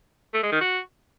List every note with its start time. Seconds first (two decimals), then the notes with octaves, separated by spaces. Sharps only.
0.34 A3
0.43 G#3
0.52 D#3
0.61 F#4